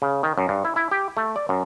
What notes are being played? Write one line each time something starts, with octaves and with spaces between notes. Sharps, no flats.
C#3
D#3
F#2
G2
E4
E4
G4
A3
D5
F#2